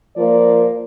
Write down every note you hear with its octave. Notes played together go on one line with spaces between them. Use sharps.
F3 A#3 A#4 D5